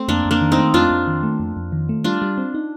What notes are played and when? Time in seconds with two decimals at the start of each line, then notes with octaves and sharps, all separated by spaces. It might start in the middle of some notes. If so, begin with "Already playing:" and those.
Already playing: A3 C4
0.08 F2 A#3 D4
0.25 F2
0.31 A#3 D4
0.41 D#3
0.52 C4 D#4
0.57 A3
0.74 F2 D4 F4
0.90 F2
1.07 D#3
1.23 A3
1.40 F2
1.56 F2
1.72 D#3
1.89 A3
2.04 G3 D4 F4
2.22 G3
2.38 C4
2.54 D#4